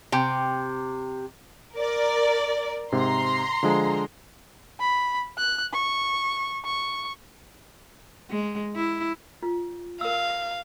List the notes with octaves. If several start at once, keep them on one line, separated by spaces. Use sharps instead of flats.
C3 G5
A#4 D5
G#2 C3 A#5 C6
D3 F3 G#3
B5
F#6
C#6
C#6
G#3
E4
F4
A#4 F5 E6